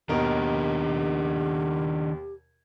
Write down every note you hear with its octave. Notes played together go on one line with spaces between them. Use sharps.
D#2 B2 D#3 D4 G4 A#4 D#5